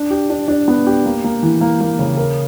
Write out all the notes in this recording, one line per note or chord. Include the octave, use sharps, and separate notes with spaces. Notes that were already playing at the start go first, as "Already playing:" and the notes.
Already playing: D4
G4
D4
D4
B3
G4
A#3
A#3
E3
A#3
A#3
C#3
A#4